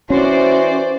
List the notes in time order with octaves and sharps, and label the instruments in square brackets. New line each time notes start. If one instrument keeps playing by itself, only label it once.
[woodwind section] E3 [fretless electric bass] C#4 [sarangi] F#4 [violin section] C5 D5